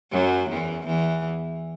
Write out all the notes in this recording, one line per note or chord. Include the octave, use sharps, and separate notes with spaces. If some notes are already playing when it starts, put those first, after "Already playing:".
F#2 F#3
E2 E3
E2 E3